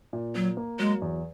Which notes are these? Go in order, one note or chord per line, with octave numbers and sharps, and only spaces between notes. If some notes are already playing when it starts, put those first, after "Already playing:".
A#2
F#3 A#3
A#3
F#3 G#3
E2